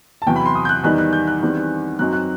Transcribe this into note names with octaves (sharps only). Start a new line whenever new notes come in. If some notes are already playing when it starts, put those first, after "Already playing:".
A5
E2 C3 F#3 G5
B5
C6
D#6
G6
F#6
E2 D#3 G3 D#4 F#6
F#6
G6
F#6
E2 D#3 G3 C4
F#2 F#3 C4 D#4 F#6
F#6